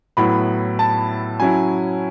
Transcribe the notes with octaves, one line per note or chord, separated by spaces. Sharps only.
A2 F#3 B3 E4 B5
A5
F#3 C#4 E4 G#5